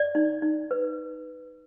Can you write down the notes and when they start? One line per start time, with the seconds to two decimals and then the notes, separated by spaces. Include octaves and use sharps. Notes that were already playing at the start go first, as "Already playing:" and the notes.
Already playing: D5
0.15 D#4
0.42 D#4
0.71 B4